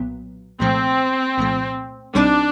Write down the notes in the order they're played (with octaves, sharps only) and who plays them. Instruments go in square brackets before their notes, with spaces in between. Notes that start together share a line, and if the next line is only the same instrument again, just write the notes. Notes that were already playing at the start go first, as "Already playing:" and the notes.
Already playing: [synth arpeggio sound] B1 A#2 F#3 B3
[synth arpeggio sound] C2 A#2 F3 A3 [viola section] C4
[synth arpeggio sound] C2 A#2 F3 A3
[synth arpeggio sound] B1 B2 G3 C4 D#4 [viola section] D4